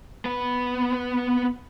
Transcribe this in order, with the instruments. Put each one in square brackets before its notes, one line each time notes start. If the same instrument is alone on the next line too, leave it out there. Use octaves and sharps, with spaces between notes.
[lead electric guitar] B3 B4